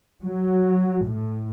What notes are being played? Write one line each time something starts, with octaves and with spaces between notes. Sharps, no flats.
F#3
A2